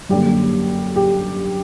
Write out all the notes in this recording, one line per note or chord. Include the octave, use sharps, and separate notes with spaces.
F#2 D3 G3 A#3 G4
G4